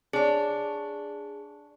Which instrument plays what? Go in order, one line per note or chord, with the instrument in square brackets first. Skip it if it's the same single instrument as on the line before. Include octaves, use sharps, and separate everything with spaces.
[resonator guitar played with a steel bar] D4 C#5 [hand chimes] G#4